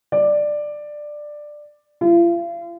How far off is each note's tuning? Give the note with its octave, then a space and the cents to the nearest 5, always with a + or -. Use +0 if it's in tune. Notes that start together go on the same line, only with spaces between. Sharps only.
D5 +10
F4 -40